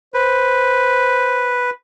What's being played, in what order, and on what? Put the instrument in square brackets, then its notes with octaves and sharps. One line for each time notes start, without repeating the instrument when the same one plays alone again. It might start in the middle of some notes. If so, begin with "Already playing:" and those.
[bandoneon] B4 [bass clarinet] C5